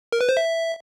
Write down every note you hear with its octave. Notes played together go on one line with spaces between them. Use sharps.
A#4
B4
C5
E5